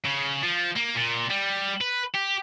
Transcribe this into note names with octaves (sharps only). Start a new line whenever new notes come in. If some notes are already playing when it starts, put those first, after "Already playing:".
C#3
F3
A#3
A#2
G3
B4
G4